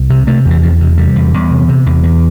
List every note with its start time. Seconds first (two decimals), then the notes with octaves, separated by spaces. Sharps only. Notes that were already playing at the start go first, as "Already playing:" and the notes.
Already playing: C2
0.10 C3
0.27 C3 A3
0.45 E2
0.50 E3
0.62 E2 F3
0.81 C3
0.97 C3 G3
1.16 E2
1.34 E2
1.51 C3
1.68 C3
1.86 E2
2.03 E2